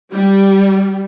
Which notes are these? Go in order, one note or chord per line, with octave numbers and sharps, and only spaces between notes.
G3